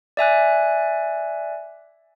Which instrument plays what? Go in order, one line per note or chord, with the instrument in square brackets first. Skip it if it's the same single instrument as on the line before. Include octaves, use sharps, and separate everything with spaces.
[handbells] D5 E5 G#5 F#6